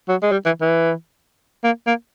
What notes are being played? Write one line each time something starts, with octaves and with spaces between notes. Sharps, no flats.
F#3
G#3
G3
E3
E3
A#3
A#3